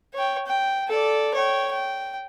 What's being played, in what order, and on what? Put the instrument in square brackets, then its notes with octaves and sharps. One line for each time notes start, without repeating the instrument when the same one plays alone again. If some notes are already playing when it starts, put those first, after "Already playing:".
[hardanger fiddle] C#5 G5
G5
A4 D5
C#5 G5
G5